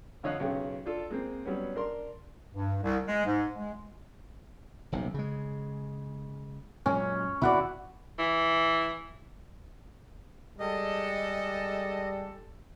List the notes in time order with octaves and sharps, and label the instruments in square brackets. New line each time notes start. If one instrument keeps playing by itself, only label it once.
[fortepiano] F2 D3 C#5 D#5 F5 F#6
B1 C#3 C#4 G4
D4 F4 A4
G#3 A#3 C4
F#3 G3 B3 C#4
D4 A#4 C6
[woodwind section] G2
C2
G#3
G#2
G#3
[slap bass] D#1 B1 C3
C#3 G#3
[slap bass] F#2 A#2 G#3 [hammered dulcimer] C#4
[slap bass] D#2 B2 [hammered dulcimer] E4 F#4 D5
[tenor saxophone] E3
[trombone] G3 [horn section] G#3 G4 A4 [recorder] D#5